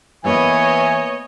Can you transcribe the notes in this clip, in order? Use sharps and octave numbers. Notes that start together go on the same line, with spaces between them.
E3 A#3 B3 B4 C#5 D#5 E5 G#5